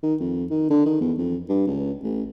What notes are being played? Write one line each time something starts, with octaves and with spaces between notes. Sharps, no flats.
D#3
F2
D#3
D3
D#3
E2
F2
G2
C#2
A1